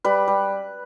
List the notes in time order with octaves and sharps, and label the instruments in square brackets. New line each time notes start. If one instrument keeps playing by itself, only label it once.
[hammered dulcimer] G3 B4
G3